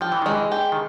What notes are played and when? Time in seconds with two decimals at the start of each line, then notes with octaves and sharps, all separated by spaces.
0.01 F3 G4
0.12 E3
0.22 D#3 G#3
0.32 E3
0.52 G4
0.72 D#3